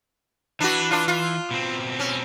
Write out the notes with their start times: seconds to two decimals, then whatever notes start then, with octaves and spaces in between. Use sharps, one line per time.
0.60 E3 D4 F#4 B4
0.91 D4 F4
1.08 F4
1.51 B2 C4
1.99 C#4